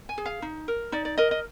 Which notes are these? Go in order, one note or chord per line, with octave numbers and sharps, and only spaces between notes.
G#5
G#4
F5
D#4
A#4
D#4 D5
D5
A#4 D#5
D#5